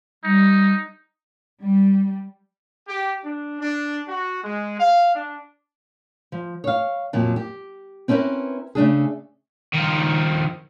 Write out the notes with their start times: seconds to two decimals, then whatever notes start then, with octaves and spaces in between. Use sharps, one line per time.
0.24 G3 D#4
1.60 G3
2.87 G4
3.23 D4
3.60 D4
4.07 F#4
4.42 G#3
4.78 F5
5.14 D4
6.32 F3
6.64 C#5 F5
7.13 F2 A#2 F#3
7.36 G4
8.08 C4 C#4 E4 G#4 A#4 B4
8.75 C#3 A3 D4 G#4
9.73 D#3 F3